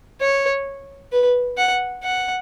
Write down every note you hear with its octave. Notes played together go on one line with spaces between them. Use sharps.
C#5
B4
F#5
F#5